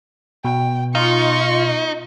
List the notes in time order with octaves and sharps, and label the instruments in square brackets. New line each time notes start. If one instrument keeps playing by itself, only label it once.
[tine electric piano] B2 [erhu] G5
[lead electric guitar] D#4 [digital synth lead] F4 [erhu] C#6